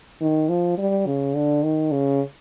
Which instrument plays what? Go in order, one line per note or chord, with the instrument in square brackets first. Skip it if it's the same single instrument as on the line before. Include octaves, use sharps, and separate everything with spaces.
[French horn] D#3
F3
G3
C#3
D3
D#3
C#3